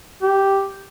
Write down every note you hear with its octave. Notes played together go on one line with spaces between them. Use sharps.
G4